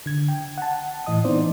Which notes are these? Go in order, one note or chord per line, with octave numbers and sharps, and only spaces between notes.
D3 G#6
G5
F#5 A5
A2 E3 D#5 D#6
E3 B3 C4 D#4 C5 D5